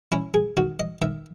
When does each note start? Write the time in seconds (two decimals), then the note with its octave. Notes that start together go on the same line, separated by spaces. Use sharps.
0.12 C#4 E4
0.34 G#4
0.57 D#3 F#4
0.80 D#5
1.02 D#3 E5